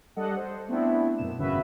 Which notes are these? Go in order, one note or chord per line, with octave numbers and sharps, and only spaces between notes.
G3 D4 A4 D#5 F#5
C5
A3 B3 C4 D4 E4
F#2 B2 E7
G#1 F#2 C#3 F#4 B4 E5